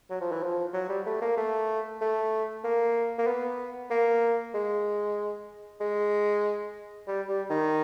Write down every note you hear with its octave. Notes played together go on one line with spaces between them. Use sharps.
F#3
F3
E3
F3
F#3
G3
A3
A#3
A3
A3
A#3
A#3
B3
A#3
G#3
G#3
G3
G3
D#3